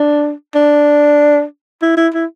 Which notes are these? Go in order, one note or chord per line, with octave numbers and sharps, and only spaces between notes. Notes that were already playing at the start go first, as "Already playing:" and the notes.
Already playing: D4
D4
E4
E4
E4